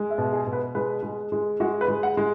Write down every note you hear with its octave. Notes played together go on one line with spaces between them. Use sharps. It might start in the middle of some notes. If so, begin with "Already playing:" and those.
Already playing: G#3
E5
B2
G#4
B2
B4
G#3 B4
G#3
G#3
G#3 F#4
B4
G#3
F#5
G#3